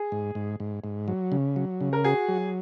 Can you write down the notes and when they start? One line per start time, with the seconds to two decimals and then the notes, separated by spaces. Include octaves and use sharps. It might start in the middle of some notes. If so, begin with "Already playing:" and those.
Already playing: G#4
0.12 G#2
0.35 G#2
0.60 G#2
0.84 G#2
1.08 F#3
1.32 C#3
1.56 F#3
1.81 C#3
1.93 A#4
2.04 F#4 G#4
2.29 F#3